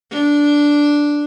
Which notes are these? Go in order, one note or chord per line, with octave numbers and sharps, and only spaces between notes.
D4